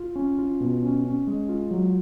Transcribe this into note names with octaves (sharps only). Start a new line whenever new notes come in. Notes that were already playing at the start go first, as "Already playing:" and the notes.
Already playing: F4
C#4
F4
B2
C#4
C#4
G#3
F4
F#3